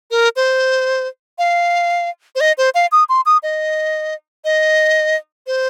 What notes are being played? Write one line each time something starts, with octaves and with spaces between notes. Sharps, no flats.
A#4
C5
F5
C5
D#5
C5
F5
D#6
C6
D#6
D#5
D#5
C5